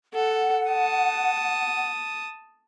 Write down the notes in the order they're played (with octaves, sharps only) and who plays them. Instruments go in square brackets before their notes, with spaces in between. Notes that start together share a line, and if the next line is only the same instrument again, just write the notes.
[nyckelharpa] A4 [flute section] F#5
[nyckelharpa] A5 D#6